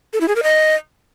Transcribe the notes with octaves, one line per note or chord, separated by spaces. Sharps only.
A4
E4
G#4
A#4
D#5